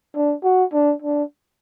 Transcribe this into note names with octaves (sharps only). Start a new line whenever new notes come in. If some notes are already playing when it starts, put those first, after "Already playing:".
D4
F#4
D4
D4